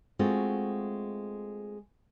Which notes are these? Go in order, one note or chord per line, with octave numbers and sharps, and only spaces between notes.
G#3 A3 C4 F4 F#4